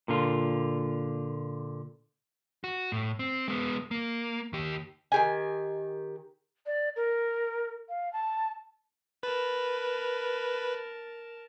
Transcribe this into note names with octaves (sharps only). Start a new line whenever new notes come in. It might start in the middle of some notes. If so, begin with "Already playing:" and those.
A#2 D3 F4
F#4
A2
C4
G#3 B3
A#3
D#2 G4
D#3 G4 G#5
D5
A#4
F5
A5
A#4 B4 A5